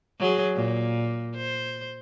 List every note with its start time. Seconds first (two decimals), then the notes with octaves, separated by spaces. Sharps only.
0.20 F#3 G#4
0.55 A#2
1.36 C5